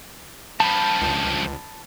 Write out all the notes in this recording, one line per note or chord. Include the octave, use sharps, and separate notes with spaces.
G2 F3 A5 B5
C#2